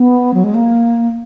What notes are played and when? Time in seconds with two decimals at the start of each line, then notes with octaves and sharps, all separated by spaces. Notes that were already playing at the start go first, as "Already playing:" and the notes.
Already playing: B3
0.34 F#3
0.44 G#3
0.54 A#3